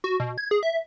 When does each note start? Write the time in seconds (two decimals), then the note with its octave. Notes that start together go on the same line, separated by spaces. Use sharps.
0.04 F#4
0.20 B2
0.38 G#6
0.51 G#4
0.63 E5